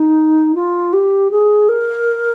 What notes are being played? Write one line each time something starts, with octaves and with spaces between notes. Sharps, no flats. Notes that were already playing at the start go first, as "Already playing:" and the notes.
Already playing: D#4
F4
G4
G#4
A#4